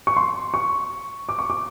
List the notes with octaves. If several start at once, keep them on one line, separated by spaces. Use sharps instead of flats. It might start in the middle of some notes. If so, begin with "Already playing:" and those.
C#6
C6
C#6
D6
C#6
D6